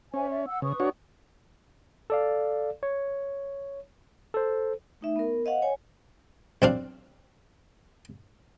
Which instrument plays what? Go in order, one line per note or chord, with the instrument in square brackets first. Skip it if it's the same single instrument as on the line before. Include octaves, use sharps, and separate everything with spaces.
[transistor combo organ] C#4 [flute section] C5 E5 G#5
[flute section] D5 E5
F#5 E6
[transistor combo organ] C#3 [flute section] B4 C#6 D#6
[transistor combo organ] D4 F#4 C#5
[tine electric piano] A4 D5 F5
C#5
A4 C5
[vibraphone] A3 D#4 E5
B3 A#4
C5 D#5 F5 F#5
C#5 G#5
[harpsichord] B1 C4 D4 F5